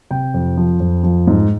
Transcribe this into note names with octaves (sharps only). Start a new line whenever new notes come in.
C3 G5
F2
F3
F2
F3
G#2